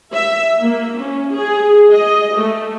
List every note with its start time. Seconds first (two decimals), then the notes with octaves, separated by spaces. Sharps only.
0.13 E5
0.62 A#3
0.98 C#4
1.36 G#4
1.91 D#5
2.34 A3